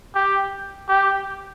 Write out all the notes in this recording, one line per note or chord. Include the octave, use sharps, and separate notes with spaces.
G4
G4